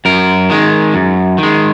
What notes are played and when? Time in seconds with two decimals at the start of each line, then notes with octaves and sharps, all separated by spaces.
0.05 F#2 A#4
0.50 D#3 G#3
0.94 F#2
1.38 D#3
1.43 G#3